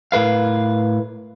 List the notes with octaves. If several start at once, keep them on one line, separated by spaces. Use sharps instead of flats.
A2 A#4 B4 F5